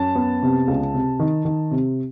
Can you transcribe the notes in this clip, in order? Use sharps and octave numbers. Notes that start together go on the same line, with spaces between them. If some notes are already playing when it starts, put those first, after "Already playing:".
Already playing: F#2 A5
B3
C3
C#2
C3
D#3
D#3
C3